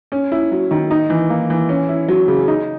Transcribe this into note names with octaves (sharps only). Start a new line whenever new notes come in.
C#4
E4
F#3
D#3
D#4
E3
A#3
E3
C#4
E4
F#3
C#3
D#4